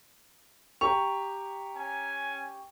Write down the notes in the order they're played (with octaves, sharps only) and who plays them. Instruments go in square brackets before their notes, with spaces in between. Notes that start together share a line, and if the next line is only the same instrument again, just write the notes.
[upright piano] G4 [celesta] A#5 F7 [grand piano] C#6
[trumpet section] C#4 G#5